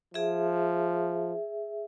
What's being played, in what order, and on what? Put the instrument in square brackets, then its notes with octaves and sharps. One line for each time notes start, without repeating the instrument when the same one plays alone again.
[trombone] F3 [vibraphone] G#4 E5